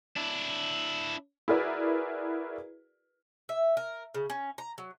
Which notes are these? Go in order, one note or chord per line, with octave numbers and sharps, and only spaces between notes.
D4 E4
E4 F#4 G#4 A#4 B4 D5
E5
A#4
C#3
C#4
A#5
F#3